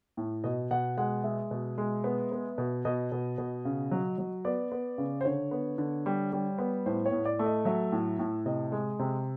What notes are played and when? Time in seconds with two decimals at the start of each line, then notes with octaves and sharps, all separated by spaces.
0.17 A2
0.44 B2 D#5
0.71 B2 F#5
0.98 G#3 F#5
1.24 G#3 E5
1.51 B2
1.78 G#3
2.04 B3
2.32 B3
2.58 B2
2.85 B2 D#5
3.12 B2
3.38 B2
3.65 C#3
3.91 F#3
4.18 F#3
4.45 B3 D5
4.72 B3
4.98 C#3
5.21 C5
5.25 D3 C#5
5.51 B3
5.78 D3
6.06 G3
6.33 G3
6.59 B3
6.86 A2 C5
7.06 C#5
7.12 A2
7.25 D5
7.39 A3
7.46 D#5
7.65 F#3 E5
7.92 A2
8.19 A2
8.46 C3 D#5
8.72 G#3
8.99 C3